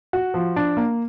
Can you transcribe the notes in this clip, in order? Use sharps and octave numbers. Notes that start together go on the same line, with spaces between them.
F#4
F3
D4
A#3